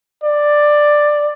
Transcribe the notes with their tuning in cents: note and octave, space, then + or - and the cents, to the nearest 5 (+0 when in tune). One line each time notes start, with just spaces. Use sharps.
D5 +10